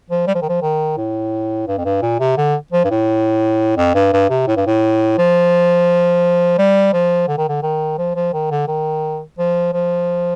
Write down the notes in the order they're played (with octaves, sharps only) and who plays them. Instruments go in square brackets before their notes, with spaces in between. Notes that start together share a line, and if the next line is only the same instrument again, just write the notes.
[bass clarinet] F3
G3
F3
D#3
F3
D#3
A2
G2
F2
G2
A#2
C3
D3
F3
G2
A2
F2
G2
G2
C3
A2
G2
A2
F3
G3
F3
D3
D#3
D3
D#3
F3
F3
D#3
D3
D#3
F3
F3